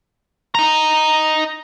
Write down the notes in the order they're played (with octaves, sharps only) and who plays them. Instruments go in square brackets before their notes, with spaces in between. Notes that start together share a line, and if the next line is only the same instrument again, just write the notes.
[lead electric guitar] D#5 A#5